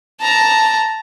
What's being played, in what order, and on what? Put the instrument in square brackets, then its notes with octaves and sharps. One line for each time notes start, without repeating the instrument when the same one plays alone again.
[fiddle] A5 A#5